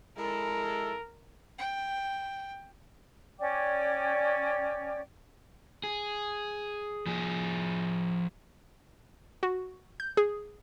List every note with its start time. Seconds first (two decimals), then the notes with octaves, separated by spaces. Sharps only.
0.18 G#3 E4 A4 A#4
1.59 G5
3.39 C#4 D5 G5 D6
5.84 G#4
7.07 F3 G#4
9.43 F#4
10.00 G6
10.17 G#4